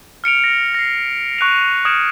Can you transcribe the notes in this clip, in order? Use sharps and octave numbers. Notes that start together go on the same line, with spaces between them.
F6 C#7 D7 F7
A#6
A#6 C7
C#6 F#6 D#7 F7
D#6 F6 G#6 C#7 D7 E7